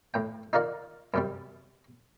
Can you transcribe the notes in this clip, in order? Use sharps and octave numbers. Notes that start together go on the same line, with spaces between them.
A2 G5
D#4 F4 A#4 D5 F#5
F#2 C3 G3